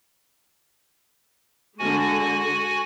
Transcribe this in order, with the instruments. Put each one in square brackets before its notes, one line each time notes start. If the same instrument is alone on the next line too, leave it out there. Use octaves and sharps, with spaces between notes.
[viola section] D3 G#3 [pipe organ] F#4 G#5